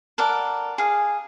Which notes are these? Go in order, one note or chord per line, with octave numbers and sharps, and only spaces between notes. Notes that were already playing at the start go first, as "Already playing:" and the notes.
A4 A#4 D5 F#5
G#4 F5